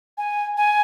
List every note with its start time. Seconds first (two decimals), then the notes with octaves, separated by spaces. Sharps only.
0.18 G#5
0.57 G#5